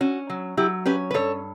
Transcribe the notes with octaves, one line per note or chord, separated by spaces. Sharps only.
C#4 F#4
F#3
F#3 E4 G4
C#4 G4 B4
B4
G2 A4 C#5